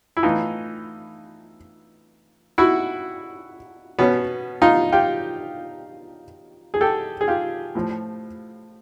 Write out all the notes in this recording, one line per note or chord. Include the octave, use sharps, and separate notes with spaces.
E4
A2 E3 D#4 F4
E4 F#4
B2 B3 C#4
D#4 F4
F4 G4
G#4
G4 A4
G#4
F4 G4
A2 F3